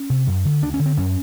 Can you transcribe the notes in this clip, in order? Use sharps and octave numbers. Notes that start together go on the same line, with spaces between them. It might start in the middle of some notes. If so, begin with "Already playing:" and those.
Already playing: C#4
C3
F#2
D3
D2 D4
C#4
D3
C4
F#2 C#4